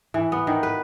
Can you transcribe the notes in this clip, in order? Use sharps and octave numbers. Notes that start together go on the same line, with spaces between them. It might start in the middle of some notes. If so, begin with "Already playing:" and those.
E3
B3
D#3
B4